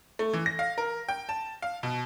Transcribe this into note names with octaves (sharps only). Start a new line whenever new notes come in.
A3
E3
A#6
F5
A#4
G5
A5
F5
B2